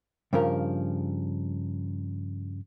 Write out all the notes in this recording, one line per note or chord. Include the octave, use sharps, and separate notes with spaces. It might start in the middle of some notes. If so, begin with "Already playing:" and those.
G2 C#3 F3 A#4